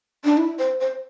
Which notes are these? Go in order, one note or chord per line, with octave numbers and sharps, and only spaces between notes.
D4
E4
C5
C5